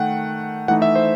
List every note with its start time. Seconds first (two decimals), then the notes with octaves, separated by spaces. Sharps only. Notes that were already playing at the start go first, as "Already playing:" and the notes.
Already playing: D#3 A3 F#5 G5
0.68 E3 A3 D#4 F#5
0.82 E5
0.95 C5